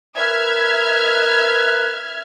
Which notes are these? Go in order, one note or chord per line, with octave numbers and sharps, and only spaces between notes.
A#4 B4 E5 F6 G#6